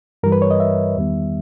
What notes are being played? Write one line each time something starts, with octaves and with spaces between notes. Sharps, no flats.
G2 E3 G3 A#4
B4
C#5
D#5
E5
E2 D#3 G3 B3